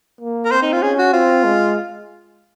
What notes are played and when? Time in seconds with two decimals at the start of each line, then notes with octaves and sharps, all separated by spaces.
0.21 A#3
0.45 A#4
0.51 C4 C5
0.62 D#4
0.72 F4
0.82 C#4 G#4
0.98 F#4
1.13 C4 F4
1.44 G#3